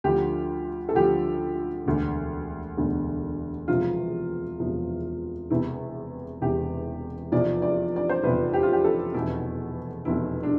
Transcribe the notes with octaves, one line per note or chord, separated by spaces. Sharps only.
D2 D3 F3 G4
A4
D2 D3 F3 G4
E1 D2 D3
E1 D2 D3
E1 E2 C3 F3 F4
E1 E2 C3 F3
E1 E2 C3 E3 E4
E1 E2 C3 E3 G4
F1 E2 C3 F3 D5
D5
D5
C5
F1 E2 C3 F3 B4
G4
F4
G4
A4
F1 E2 B2 E4
F1 E2 B2 E4
D4